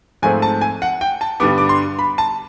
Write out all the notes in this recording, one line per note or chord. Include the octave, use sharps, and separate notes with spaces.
G#2 F3 A3 C4 G#5
A5
G#5
F#5
G5
A5
G2 D3 G3 B3 D6
D6
C6
B5
A5